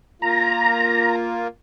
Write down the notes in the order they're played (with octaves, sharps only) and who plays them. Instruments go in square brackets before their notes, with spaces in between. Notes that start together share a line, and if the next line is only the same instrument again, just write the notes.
[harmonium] A#3 F4 [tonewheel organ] A#5